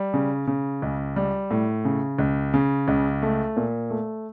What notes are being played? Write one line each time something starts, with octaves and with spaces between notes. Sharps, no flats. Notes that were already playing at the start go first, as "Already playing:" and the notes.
Already playing: G3
C#3
C#3
C#2
G3
A2
C#3
C#2
C#3
C#2
A3
A#2
A3